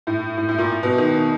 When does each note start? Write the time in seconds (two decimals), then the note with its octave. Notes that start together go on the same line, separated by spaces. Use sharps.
0.07 A2
0.37 A2
0.49 A2
0.58 A#2
0.83 B2
0.98 D#3